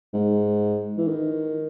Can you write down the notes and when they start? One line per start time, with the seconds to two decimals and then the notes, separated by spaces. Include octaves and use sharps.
0.13 G#2
0.98 E3
1.08 D#3